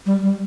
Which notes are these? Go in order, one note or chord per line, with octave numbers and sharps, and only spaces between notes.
G3
G3